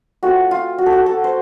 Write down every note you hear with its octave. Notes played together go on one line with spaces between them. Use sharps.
A3 C4 F4 F#4
F4
F#4
A4
F#4
A4
C5